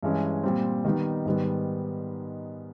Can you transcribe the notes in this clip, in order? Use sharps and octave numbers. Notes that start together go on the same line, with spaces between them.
G2 E3 G#3 C#4
A#2 G3 C4
D#3 G3 B3 D#4
G#2 D#3 G3 B3